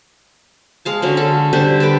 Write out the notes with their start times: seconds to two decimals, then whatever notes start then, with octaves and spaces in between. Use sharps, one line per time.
0.85 G#3 F5 A5
1.02 D3 F#3 C#4
1.17 A4
1.53 D3 G3 D4 C5
1.80 A4 B4 B5 D6